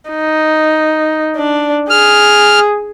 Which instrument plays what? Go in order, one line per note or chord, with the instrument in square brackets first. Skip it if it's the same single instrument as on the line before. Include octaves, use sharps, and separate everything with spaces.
[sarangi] D#4
D4
[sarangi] G#4 [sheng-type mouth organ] F6